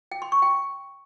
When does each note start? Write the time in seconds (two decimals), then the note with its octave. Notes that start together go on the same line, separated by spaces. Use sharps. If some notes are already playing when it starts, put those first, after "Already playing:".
0.12 G5
0.22 C6
0.32 C#6
0.42 G5